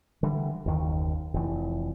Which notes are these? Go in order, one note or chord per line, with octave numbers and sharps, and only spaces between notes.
D3 E3 G3
F#1 D#2 D#3
F1 E3